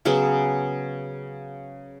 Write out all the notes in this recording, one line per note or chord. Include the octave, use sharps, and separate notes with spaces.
C#3 F#3 B3 G#4